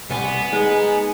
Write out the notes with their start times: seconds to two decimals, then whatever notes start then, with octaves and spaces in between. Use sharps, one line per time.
0.10 C2 B3 G#5
0.53 G#3 D#4 G#4